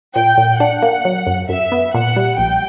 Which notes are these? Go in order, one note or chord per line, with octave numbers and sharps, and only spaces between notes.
A#2 G5
A#2
D4 F#5
A#3
F#3
F#2
F#2 E5
B3
A#2 F#5
G3
A#1 G5